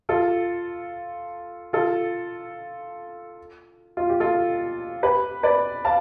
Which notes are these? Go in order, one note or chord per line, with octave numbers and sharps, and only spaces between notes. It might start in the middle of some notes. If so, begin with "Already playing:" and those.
F4 A4
F4 A4
F4
G4
F4 A4
G4 B4
B4 D5
F5 A5